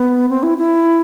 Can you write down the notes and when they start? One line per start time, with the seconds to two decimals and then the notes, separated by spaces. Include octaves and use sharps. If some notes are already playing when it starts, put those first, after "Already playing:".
Already playing: B3
0.29 C4
0.43 E4
0.58 E4